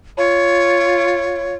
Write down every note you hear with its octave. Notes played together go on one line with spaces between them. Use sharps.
F4 C#5